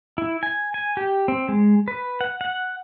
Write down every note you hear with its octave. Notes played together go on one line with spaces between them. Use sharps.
E4
G#5
G#5
G4
C4
G#3
B4
F#5
F#5